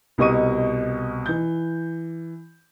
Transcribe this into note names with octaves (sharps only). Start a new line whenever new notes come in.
C2 B2 D#5 C#6 D#7
E3 G6